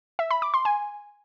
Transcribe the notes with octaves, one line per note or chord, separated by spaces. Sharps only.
E5
B5
D6
C6
G#5